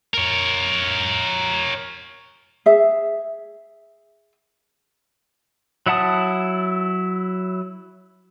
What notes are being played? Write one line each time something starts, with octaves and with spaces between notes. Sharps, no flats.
A#4 C#5
G#4 E5
F#3 E4 F#5 A5 D#6